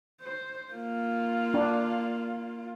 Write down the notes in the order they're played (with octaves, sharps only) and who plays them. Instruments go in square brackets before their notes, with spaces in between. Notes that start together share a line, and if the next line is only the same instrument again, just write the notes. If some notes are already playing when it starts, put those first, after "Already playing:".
[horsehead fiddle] C5
A#3 F4
[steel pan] D4